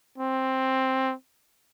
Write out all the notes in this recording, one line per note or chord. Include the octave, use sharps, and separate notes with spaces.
C4